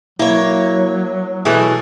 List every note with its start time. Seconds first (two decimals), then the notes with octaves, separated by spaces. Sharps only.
0.19 F#3 A#3 E4 C#5
1.45 B2 E3 A3 G#4